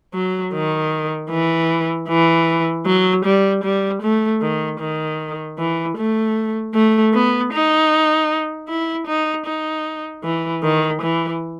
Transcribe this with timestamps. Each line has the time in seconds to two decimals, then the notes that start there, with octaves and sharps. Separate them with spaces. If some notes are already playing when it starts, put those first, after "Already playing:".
0.14 F#3
0.53 D#3
1.30 E3
2.08 E3
2.86 F#3
3.25 G3
3.64 G3
4.02 A3
4.41 D#3
4.80 D#3
5.58 E3
5.97 A3
6.74 A3
7.14 B3
7.53 D#4
8.69 E4
9.07 D#4
9.46 D#4
10.24 E3
10.63 D#3
11.02 E3